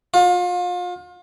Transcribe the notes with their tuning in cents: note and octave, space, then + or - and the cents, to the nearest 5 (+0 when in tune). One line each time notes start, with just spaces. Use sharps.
F4 +35